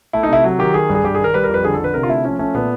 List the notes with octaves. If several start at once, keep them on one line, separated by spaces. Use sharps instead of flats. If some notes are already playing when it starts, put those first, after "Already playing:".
A3 E4
D#4
C3 E4
F#3
D#3 G4
D#3 G#4
G2
G#4
G2 G4
G#4
D#3
A#4
G3 B4
A#4
F2 B4
D3 G#4
A4
D3 B4
C3 A#4
F4
A3 E4
F3 C#4
A3 C#4
A#2 B3